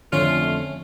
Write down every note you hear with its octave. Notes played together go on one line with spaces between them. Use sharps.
F2 D3 A3 C#4 F4